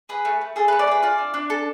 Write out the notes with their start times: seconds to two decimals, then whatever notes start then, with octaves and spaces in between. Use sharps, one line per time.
0.09 G#4 B4
0.25 A3
0.41 A3
0.56 G#4 A4
0.68 B4
0.72 A3
0.79 D5
0.87 G#4 B4
1.03 F4 D5
1.18 D4
1.34 D4
1.50 A4